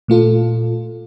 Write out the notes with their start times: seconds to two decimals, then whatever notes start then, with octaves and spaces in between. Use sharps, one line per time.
0.08 A#2 A3 F4 A4